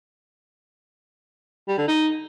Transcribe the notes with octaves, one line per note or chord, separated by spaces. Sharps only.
G3
D3
D#4